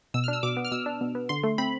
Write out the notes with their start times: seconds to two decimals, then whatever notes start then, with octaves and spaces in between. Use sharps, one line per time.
0.14 B2 E6
0.24 F6
0.28 D4 E6
0.43 B2 D6
0.57 B3
0.65 F6
0.72 B2 E6
0.86 D4
1.01 B2
1.15 B3
1.29 D3 C6
1.43 A3
1.58 C4 B5